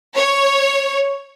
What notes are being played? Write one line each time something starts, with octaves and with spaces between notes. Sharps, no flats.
C#5